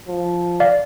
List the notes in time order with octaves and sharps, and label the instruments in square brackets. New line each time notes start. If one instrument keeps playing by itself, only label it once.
[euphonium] F3
[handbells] D5 F5